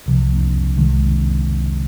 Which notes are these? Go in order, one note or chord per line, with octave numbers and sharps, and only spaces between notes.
C2 C3 F3
C2 C3 D#3 G#3